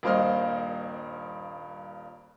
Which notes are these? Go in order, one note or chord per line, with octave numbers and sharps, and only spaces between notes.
D#1 G2 A#3 C5 D#5 F6